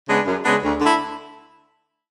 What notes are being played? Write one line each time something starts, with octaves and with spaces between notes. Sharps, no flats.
C#3 G#3 B3 D4
F#2
C#3 G#3 B3 D4
D2
D3 A3 E4